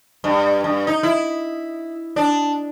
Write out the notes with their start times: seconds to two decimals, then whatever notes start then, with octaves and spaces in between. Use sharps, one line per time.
0.24 G2
0.64 G2
0.87 D#4
1.03 E4
2.16 D4